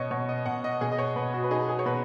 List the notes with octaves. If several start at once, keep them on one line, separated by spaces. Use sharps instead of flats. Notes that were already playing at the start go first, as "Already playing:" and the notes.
Already playing: B2 C#5 D#5
B2 C#5
D#5
B2 F#5
D#5
B2 G#4
D#5
C#5
B2 B4
F#4
B4
D#4 G#4
G#4
C#5
B2 B4